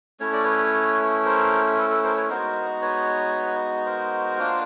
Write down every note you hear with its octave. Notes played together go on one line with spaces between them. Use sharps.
A3 C#4 E4 C#5
D5
B4 C#5
A#4 C5
A4 B4
A4 B4
A#4 C5
B4 C#5
G#3 B3 D#4 F#4 A#4 C5
B4 C#5
A#4 C5
A#3 D4 F4